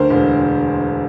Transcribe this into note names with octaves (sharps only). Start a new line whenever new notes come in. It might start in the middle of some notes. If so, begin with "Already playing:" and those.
Already playing: D2 D3 A#4 C5
E1